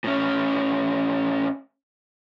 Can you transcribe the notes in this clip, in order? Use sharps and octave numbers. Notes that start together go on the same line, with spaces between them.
A2 C#4